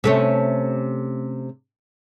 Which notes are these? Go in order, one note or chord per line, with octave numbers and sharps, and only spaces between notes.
C3 A3 C#4